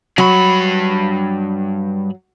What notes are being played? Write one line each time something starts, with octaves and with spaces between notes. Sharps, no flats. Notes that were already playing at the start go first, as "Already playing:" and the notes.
G2 F#3 B5